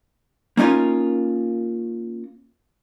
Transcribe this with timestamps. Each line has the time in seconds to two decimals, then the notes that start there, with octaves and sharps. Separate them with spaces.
0.57 A#3 C#4 D#4 F4 A#4